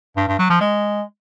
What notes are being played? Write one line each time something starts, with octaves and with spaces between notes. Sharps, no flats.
G2
G2
F#3
F3
G#3